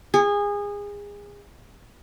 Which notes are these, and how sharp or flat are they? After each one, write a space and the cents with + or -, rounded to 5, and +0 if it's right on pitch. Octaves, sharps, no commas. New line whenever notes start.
G#4 -25